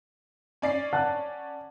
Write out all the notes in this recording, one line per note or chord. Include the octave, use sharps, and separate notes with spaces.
C#4 D5 C7
F#5 A5 F#6